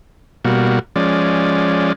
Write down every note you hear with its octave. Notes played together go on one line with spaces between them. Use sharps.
B2 G3 A#3 F#4
F3 G#3 C#4 D5